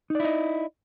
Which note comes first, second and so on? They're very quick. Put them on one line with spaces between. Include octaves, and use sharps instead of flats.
D#4 D5 E4 D#5